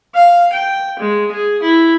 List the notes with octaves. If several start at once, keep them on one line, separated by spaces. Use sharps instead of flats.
F5
G5
G#3
G#4
E4